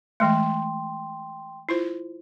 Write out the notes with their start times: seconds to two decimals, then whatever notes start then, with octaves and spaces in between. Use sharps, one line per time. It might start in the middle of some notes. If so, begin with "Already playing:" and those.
0.20 E3 G#3 A3 G5 C6
1.69 E4 F4 C5